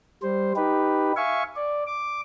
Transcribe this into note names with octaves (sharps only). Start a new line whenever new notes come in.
G3 C5
D#4 G4 B4
E5 F5 G#5 C#6
D5
D6